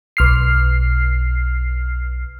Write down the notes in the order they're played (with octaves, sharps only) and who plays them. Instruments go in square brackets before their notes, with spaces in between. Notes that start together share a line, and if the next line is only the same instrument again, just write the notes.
[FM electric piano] B1 F6 C7